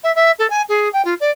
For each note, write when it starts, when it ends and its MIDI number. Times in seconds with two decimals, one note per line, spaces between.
0.03 0.14 76
0.15 0.31 76
0.39 0.47 69
0.50 0.62 80
0.69 0.89 68
0.93 1.02 79
1.05 1.14 65
1.20 1.30 74